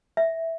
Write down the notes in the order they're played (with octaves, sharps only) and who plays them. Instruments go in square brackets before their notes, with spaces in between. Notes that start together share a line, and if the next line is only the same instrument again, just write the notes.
[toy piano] E5